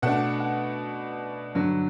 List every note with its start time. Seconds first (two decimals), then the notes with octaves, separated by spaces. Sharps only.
0.02 B2 A3 D4 F#5
0.40 F#5
1.55 G2 D3 F#3